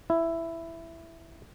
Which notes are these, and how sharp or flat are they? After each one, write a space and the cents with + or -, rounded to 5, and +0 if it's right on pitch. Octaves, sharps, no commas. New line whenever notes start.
E4 +5